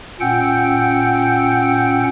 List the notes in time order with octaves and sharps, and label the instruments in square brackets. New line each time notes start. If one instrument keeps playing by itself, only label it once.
[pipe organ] A#2 C#4 F#5 G5 E6 G6